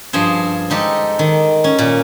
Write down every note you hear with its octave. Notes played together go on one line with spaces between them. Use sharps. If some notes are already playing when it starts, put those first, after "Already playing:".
G2 F3 G#4 C5
G#3 D#4 G4 A4
D#3
C#4
A#2